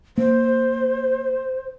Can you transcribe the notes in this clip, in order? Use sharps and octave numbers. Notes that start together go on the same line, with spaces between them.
A#3 C5